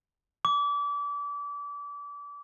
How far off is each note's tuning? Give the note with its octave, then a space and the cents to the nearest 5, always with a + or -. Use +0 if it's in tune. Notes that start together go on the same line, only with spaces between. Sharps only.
D6 -30